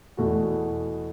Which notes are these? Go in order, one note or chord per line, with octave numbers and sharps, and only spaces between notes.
E2 B2 A3 F#4